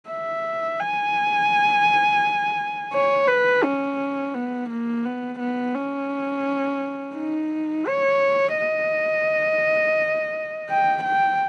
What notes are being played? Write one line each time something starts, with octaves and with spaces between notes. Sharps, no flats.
E5
G#5
C#5
B4
C#4
B3
A#3
B3
B3
C#4
D#4
C#5
D#5
G5
G5